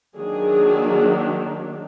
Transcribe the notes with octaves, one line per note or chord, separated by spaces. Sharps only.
D#3 F#3 A#3 D4 G#4